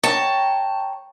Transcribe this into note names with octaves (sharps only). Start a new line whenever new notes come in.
C#5 G5 A5 A#5